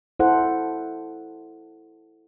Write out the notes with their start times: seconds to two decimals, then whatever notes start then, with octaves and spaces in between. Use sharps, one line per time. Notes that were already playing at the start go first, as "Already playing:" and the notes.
0.19 E4 A4 C5 F#5